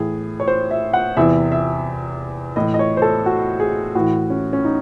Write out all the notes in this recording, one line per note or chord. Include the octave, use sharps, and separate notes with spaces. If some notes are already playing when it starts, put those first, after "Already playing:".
Already playing: A2 E3 G#4
C#5
C5
E5
F#5
E2 C3 E3 E5
E5
A2 E3 D#5
D#5
C#5
C5
A4
F#4
G#4
A2 E3 F#4
C#4
C#4
D#4